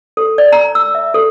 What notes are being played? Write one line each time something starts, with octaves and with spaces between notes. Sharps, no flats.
A4
D5
A#5
E6
E5
A4